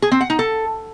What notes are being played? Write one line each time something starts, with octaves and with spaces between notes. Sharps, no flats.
G#4
C4
F#5
D#4
A4